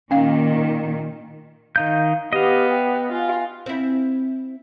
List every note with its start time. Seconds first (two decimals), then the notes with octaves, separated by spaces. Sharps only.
0.11 A#2 D#3 C#4 F5
1.76 D#3 D#4 F5 G6
2.33 B3 G4 D#5 F5
2.70 G5
3.12 F4 G#5
3.66 C4 E4